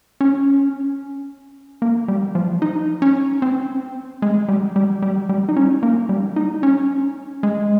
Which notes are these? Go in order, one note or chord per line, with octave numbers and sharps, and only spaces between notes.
C#4
A#3
G3
F3
D#4
C#4
C4
G#3
G3
G3
G3
G3
D#4
C#4
A#3
G3
D#4
C#4
G#3